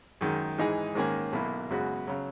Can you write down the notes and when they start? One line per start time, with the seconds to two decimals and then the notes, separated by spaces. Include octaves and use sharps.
0.21 F#2 D#3 G#3
0.58 G#2 E3 G#3 D#4 G#4
0.95 G#2 D#3 A#3 C#4 G#4
1.33 B1 B2 A#3 E4
1.70 F#2 C#3 G#3 B3 F#4
2.07 C#3 F#3